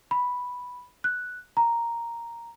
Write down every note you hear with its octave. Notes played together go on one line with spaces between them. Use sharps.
B5
F#6
A#5